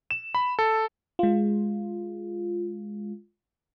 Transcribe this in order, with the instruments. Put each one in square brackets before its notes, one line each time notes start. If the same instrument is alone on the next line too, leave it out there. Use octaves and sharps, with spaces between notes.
[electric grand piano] E7
B5
A4
[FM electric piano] G#3 F4